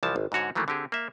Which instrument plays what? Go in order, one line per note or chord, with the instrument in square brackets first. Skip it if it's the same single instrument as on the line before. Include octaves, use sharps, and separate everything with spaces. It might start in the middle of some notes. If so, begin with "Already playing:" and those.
[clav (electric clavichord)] C2 E3 F3 A5
G#1
G#2 D3 F#4 C#5
D#3 E3 F#3 A3 A#3
D3 C4 G4 G#4
A#3 E5